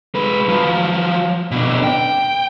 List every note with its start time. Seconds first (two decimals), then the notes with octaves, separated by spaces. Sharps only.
0.15 G#3 B4
0.49 F3 F#3
1.51 B2 D4
1.84 G5